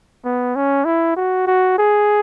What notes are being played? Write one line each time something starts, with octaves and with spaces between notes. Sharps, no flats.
B3
C#4
E4
F#4
F#4
G#4